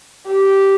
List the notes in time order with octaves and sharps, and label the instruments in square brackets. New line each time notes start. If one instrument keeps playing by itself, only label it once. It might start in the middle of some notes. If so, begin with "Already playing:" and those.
[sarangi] G4